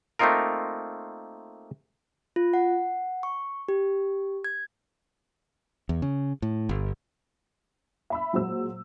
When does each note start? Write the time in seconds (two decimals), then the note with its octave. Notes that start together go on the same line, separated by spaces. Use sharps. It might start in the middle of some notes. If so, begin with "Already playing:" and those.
0.19 A3 A#3 C4 D#4 F4 A#4
2.36 F4
2.54 F#5
3.23 C#6
3.68 G4
4.44 G#6
5.89 E2
6.02 C#3
6.42 A2
6.69 G1
8.10 E5 B5 E6
8.33 A#2 F#3 G#3 C5 E6